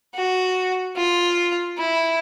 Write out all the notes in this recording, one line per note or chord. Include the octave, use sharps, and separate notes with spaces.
F#4
F4
E4